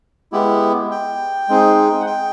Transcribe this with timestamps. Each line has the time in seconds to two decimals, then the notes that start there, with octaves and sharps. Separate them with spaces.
0.32 G#3 B3 E4 G4
0.91 G5
1.49 G#3 C4 D#4 G#4
2.00 F#5
2.06 G5